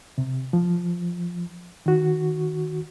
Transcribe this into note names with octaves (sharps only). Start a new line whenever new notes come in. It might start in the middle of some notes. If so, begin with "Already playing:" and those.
C3
F3
D#3 F#4